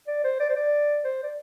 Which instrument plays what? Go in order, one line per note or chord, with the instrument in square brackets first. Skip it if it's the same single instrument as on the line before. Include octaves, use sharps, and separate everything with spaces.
[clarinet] D5
C5
D5
C5
D5
C5
D5